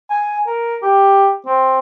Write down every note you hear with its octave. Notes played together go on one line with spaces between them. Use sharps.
G#5
A#4
G4
C4